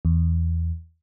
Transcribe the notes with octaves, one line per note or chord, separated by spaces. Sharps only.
E2